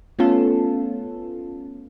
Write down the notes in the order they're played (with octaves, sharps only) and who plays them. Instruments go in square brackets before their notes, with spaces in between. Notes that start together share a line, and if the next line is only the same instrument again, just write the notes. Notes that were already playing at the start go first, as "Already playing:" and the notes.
[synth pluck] A3 B3 C#4 F4 A4